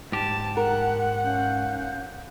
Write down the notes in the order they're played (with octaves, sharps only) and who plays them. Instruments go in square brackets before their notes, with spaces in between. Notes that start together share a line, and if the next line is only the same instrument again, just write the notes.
[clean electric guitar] G#2 G4 [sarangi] A5
[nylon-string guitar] A#4 [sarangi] F#5
[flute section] C#4 F5 G6